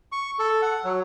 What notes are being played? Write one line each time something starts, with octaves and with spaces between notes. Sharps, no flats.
C#6
A4
F#5
F#3